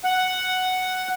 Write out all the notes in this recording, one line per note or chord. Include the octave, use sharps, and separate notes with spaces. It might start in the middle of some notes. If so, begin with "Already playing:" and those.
F#5